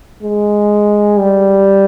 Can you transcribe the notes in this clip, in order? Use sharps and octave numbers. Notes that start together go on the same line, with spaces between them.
G#3
G3